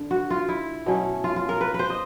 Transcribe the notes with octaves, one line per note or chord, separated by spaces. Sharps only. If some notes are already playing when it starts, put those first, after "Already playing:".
Already playing: D3 D4
F#4
F4
E4
B2 F#3 A3 C#4
F4
F4
A#4
B4
B4
C5
D#5